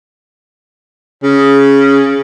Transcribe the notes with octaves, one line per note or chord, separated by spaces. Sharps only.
C#3